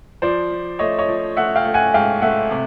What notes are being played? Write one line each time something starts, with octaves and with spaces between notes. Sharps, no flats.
F3 C5 D5
F3
A3 C#5 D#5
C#5 D#5
F3
A3 E5 F#5
F5 G5
A3
F#5 G#5
G#2 F5 G5
A3 E5 F#5
C3